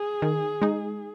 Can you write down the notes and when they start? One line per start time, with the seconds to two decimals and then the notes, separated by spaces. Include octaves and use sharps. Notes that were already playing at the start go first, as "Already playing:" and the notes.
Already playing: G#4
0.22 D#3
0.62 G#3 D#4